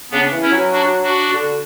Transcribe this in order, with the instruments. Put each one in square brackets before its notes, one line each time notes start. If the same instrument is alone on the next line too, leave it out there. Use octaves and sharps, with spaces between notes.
[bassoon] C#3 [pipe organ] B3 D4
[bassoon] E3
[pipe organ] C#4 E4
[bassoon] F#3
[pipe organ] D4 F#4
D4 F#4
[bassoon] D3